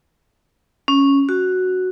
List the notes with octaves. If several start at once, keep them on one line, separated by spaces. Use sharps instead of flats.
C#4
F#4